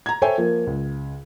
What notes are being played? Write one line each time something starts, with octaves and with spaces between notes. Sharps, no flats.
A#5 G#6
A4 C5 C#5 E5 G5 G#5
F3 A#3
C#2